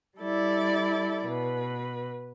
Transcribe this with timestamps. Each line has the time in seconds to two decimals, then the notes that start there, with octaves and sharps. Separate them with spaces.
0.19 G3 E4 A4 D5
1.25 B2 B4